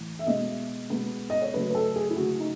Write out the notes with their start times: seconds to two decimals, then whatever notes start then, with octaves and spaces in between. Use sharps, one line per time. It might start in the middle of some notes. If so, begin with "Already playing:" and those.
Already playing: A2 E3
0.19 E5
0.27 B2 G#3 B3 D#5
0.90 B2 G#3 B3
1.30 D#5
1.42 C#5
1.53 C#3 F#3 A3 B4
1.70 B4
1.75 A4
1.96 G#4
2.10 E4
2.16 C#3 F#3 A3 F#4
2.40 D#4